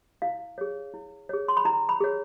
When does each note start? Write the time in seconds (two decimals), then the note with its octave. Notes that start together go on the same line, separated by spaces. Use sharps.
0.22 E4 F5
0.58 G#4 C#5
0.94 E4
1.29 G#4 C#5
1.48 C6
1.57 B5
1.65 E4 A#5
1.89 B5
2.00 G#4 C#5